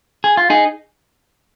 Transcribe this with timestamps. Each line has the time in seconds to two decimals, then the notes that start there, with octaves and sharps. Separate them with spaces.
0.24 G#4
0.37 F4
0.50 D#4 G#4